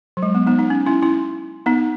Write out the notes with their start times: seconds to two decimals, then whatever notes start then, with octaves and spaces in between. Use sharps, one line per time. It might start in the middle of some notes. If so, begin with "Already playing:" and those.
0.17 F#3
0.23 G#3
0.35 B3
0.46 B3 D#4
0.59 B3 D#4
0.70 C#4
0.86 C#4 E4
1.03 C#4 E4
1.66 B3 D#4